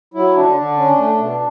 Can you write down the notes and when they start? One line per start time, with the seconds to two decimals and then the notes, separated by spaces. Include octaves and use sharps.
0.14 F#3 E4
0.35 D3 D4
0.56 D3
0.77 C#4
0.98 A3
1.19 B2